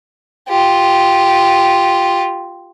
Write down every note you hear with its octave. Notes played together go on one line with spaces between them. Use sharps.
F4 G4